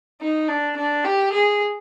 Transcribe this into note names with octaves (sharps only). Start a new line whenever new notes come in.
D#4
D4
D4
G4
G#4